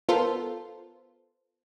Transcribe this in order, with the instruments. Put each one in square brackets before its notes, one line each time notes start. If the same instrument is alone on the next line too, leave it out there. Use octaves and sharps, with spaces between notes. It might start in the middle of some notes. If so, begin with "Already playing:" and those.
[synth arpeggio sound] B3 F4 A4 A#4 C5